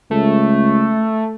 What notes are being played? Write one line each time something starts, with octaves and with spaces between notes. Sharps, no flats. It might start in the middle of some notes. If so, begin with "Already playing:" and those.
C#2 A3